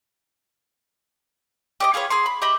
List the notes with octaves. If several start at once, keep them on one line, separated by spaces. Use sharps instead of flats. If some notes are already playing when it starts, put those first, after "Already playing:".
G4 D5 D#5
F4 G#4 B4 C#5
G#4 A#5 C6
B5
G4 D#5 E5 B5